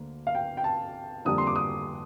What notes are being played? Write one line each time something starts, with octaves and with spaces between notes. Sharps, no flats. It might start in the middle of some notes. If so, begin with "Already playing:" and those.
Already playing: D2 D3 A#3
F5
G5
G5
A5
F2 D3 G3 A#3 D4 D#6
C6
D6
D#6